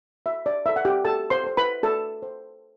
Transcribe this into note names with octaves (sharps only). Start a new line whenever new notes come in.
F#4 E5
D5
A4 C5 E5
F#5
G4 G5
F#4 A4 A5
C5 C6
A4 C5
B4 B5
F#4 A4 A5
C5